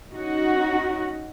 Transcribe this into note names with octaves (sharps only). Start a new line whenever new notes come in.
C#4 D#4 F#4